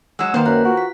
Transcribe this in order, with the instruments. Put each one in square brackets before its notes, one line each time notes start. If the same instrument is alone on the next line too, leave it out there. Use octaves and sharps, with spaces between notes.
[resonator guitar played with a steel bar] F#3 G#3 [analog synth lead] E6
[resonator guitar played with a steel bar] D#3 C5 [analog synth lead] A#3 [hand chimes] B4 G5 C6
[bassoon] F#2 [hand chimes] F5 A#5 F#6
[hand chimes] F4 [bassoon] F#4
[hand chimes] B6